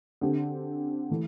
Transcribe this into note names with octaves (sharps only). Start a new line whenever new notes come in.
D3 C4 G4
E3 A3